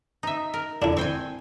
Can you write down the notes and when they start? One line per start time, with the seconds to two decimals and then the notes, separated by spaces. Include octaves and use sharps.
0.23 D#4 E5
0.54 A#4
0.82 D3 D4 E4
0.97 C4 G5 G#5 C6 C#6